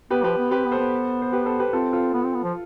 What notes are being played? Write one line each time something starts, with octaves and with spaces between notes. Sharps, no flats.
B3 G4 B4
F3 G4 B4
B3
C4 G4 B4
B3
A4 C5
B3
C5
G4 B4
A4 C5
G4 B4
C4 F4 A4
F4 A4
B3
C4
B3
F3